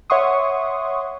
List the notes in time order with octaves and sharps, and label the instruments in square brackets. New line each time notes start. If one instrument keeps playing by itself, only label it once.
[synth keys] C#5 E5 F#5 C6 C#6 D#6